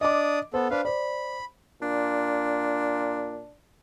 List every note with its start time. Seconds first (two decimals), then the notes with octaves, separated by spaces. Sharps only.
0.01 D4 D5 D#5 D6 D#6
0.54 B3 A4 C5
0.71 D4 B4 C5 F5
0.85 C5 D5 B5
1.82 A#2 D4